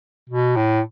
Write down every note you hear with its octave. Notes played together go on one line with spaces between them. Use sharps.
B2
A2